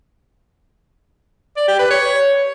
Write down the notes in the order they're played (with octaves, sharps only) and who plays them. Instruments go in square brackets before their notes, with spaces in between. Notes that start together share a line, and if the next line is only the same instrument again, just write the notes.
[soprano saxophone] D5
G4
B4
C#5